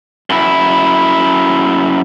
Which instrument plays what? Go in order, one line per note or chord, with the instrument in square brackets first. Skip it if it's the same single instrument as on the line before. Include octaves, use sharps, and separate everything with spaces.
[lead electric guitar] F#2 E4